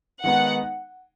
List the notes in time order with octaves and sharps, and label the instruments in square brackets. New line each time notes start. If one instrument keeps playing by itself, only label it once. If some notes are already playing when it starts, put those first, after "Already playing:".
[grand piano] D#3 G#3 B3 D#4 [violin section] F#5